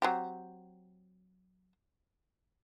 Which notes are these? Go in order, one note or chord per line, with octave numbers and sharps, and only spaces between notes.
F#3 C4 G4